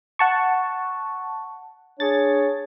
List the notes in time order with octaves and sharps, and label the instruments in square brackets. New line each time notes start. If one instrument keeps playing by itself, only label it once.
[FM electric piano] F#5 A5 C#6
[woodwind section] D4 G#4 C#5 [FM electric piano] A6